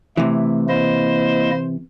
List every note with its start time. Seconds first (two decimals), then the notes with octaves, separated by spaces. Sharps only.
0.17 C3 E3 A3
0.69 A#3 E4 C5 D#5